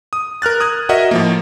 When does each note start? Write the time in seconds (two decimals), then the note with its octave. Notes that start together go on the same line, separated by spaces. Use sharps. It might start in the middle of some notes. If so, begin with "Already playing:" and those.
0.13 D#6
0.42 A#4 F6 F#6 A6
0.60 D#6 F#6 G#6
0.89 F#4 A#4 D#5 E5 F#5
1.11 A2 F3 A#3